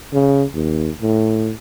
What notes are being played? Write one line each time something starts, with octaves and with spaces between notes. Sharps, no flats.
C#3
D#2
A2